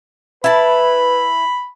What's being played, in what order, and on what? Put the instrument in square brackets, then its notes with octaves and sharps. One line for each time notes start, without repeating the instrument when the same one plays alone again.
[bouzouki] E4 A5 [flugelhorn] B4 [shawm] B5